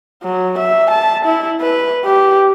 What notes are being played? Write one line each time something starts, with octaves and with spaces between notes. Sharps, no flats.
F#3
E5
A5
E4
B4
G4